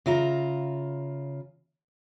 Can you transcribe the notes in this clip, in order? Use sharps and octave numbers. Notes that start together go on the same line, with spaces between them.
C#3 F4 E5 A#5